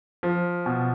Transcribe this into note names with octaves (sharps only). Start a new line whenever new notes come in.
F3
B2